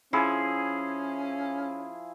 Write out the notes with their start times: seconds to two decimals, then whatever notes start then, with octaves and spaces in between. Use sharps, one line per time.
0.13 F3 C#4 E4 G#4